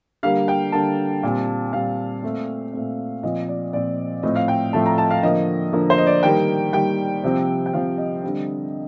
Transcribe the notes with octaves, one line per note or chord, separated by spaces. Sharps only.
D3 G3 A#3 F5
G5
D3 G3 A#3 A5
A#2 G3 C4
A#2 G3 C4 F5
A#2 A3 C4
A#2 A3 C4
A#2 F3 C4 D#5
D5
A#2 F3 C4 D5
A2 F3 A3 C4 D#5
F5
G5
A2 F3 A3 C4 A5
A#5
A5
F5
D3 F3 A#3 D#5
D3 F3 A#3
C5
D#5
D5
D#3 G3 A#3 G5
D#3 G3 A#3 G5
C3 F3 C4
G5
C3 F3 C4 F5
D#5
D3 G3 C4